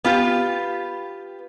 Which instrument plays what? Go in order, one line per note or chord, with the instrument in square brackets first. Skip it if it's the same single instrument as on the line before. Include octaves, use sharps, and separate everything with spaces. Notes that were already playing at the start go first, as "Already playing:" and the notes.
[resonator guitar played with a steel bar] B3 F4 G4